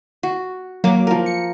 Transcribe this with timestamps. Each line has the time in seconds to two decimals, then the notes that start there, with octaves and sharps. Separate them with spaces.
0.23 F#4
0.84 F#3 A#3 D6
1.07 F3 A#4
1.26 C#7